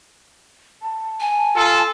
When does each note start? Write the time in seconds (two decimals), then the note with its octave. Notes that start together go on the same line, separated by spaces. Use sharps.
0.82 A5
1.20 G#5
1.56 F4 A4